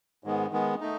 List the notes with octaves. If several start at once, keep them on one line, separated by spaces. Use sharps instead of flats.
G#2 D#3 G#3 B3
D#3 G#3 B3
A3 D#4